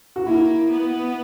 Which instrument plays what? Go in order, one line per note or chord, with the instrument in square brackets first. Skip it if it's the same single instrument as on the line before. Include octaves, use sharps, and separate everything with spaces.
[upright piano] F#4
[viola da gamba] A#3 [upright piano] E4
[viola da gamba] B3